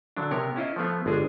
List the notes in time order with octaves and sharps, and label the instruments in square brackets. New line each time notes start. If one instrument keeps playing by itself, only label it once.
[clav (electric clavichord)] D3 F#3 D4
C3 B3 A#4 C#5
C#4 E4 F4 D#5
F3 A3 B3 F4
G1 G#3 D4 G#4